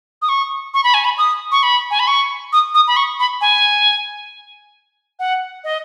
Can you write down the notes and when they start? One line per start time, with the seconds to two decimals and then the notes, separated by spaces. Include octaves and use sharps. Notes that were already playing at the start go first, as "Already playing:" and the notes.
0.22 D#6
0.29 C#6
0.74 C#6
0.84 B5
0.94 G#5
1.05 B5
1.18 D#6
1.52 C#6
1.63 B5
1.91 G#5
2.00 B5
2.07 C#6
2.53 D#6
2.74 D#6
2.88 B5
2.97 C#6
3.19 B5
3.41 G#5
5.19 F#5
5.64 D#5